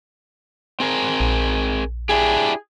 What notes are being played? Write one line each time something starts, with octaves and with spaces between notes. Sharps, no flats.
C4 G#4 A#4
A#1
D4 E4 G4 G#4